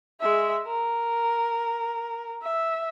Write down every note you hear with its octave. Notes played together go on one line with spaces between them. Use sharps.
G#3 E5
A#4
E5